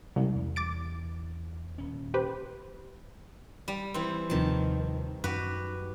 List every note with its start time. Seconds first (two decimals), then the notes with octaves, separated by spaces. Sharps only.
0.16 C2 G#3 C4 C#4
0.35 E2
0.56 D6 A6 D7
1.78 D#1 C#4
2.14 G4 B4 C5
3.68 G3
3.94 E3 C4
4.30 D#2 C3 D#3 F3 A5
5.24 F#2 F#4 G4 B4